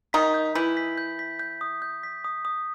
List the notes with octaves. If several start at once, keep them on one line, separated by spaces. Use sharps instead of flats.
D#3 D#4 B6
G6
E3 E4 G6
B6
G6
B6
G6
D#6
G6
B6
D#6
D#6